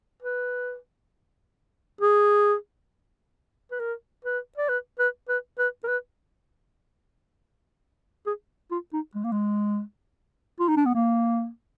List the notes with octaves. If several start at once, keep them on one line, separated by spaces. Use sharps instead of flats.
B4
G#4
B4
A#4
B4
D5
B4
B4
B4
B4
A#4
B4
G#4
F4
D#4
G#3
A#3
G#3
F4
D#4
D4
B3
A#3